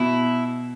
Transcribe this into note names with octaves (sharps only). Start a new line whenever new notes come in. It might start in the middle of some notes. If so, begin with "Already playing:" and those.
Already playing: B2 E4